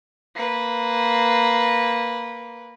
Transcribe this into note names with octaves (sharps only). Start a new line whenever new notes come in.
A#3 B4